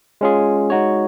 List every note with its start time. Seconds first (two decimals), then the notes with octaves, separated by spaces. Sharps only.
0.21 G#3 C#4 F4 G#4
0.70 G#3 D#4 F#4 C#5